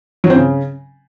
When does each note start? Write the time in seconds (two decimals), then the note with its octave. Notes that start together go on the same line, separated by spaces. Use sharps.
0.24 F#3
0.30 C4
0.36 C#3